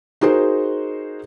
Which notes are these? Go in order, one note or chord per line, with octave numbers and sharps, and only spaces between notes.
D#4 F#4 G#4 A#4 C5